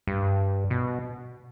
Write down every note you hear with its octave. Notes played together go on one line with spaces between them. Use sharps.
G2
B2